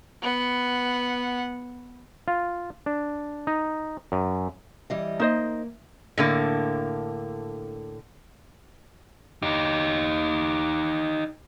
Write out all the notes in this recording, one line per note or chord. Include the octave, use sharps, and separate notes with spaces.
B3 F#5
F4
D4
D#4
F#2
E3 G3 D#5
A#3 D#4 C5 D#5
A2 D3 A#3
D#4 G4